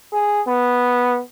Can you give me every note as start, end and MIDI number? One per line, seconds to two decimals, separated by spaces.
0.13 0.41 68
0.47 1.20 59